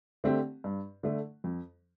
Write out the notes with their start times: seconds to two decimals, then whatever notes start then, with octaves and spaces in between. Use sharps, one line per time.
0.24 D3 A3 C4 G4
0.64 G2
1.03 D3 A3
1.44 F2